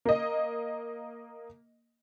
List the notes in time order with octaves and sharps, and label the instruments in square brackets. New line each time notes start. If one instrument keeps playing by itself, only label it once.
[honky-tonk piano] A#3 D#5